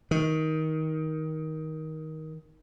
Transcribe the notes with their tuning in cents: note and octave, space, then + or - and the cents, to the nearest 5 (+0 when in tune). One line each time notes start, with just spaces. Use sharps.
D#3 +15